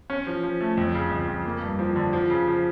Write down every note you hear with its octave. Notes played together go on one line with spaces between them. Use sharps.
C#4
F3
F3
A3
F2
C#3
F2
F2
A#3
G2
F3
D3
F3
C#3
F3